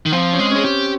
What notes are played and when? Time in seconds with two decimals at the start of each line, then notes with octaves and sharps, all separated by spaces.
0.06 D#3
0.12 F3 C4
0.33 C#4
0.39 G#3
0.51 C#4 G#4
0.65 G4